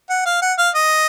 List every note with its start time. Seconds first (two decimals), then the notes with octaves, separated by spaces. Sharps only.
0.10 F#5
0.26 F5
0.42 F#5
0.58 F5
0.74 D#5